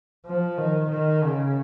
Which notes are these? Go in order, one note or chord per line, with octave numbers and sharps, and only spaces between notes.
F3
D#3
D#3
C#3